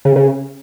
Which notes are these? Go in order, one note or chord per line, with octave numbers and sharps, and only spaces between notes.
C#3
C#3